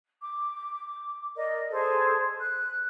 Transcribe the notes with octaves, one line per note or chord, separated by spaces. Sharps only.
D6
A#4 D5 D#5
G#4 A4 C5
F#6